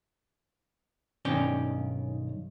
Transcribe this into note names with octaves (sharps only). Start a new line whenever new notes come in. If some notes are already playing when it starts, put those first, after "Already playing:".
B1 G2 D#3 C#4 D5 G5